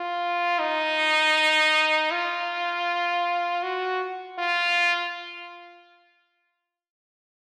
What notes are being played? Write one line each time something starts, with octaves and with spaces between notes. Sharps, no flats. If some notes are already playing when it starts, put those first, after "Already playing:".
Already playing: F4
D#4
F4
F#4
F4